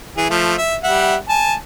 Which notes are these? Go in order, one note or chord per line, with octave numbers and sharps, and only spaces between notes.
E3 G#4
F3 A3
E5
G3 E5 F#5
G#5 A5